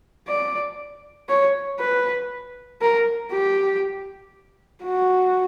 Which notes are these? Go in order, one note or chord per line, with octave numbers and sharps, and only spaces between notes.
D5
C#5
B4
A#4
G4
F#4